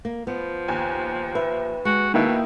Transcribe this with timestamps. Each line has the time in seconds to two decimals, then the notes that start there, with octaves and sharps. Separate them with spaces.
0.05 A#3
0.27 F3 B3
0.68 D#2 G#5
1.35 B4 E5
1.85 G#3 F#4
2.14 B2 D#3 A#3 D#4 E4